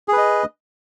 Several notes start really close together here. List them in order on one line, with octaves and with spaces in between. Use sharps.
G#4 B4 D#5